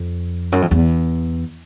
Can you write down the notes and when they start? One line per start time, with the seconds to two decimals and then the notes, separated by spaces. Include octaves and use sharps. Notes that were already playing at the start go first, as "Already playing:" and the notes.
Already playing: F2
0.52 F#2
0.62 F2
0.71 E2